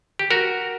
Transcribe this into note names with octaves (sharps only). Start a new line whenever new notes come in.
G4
F#4 A#4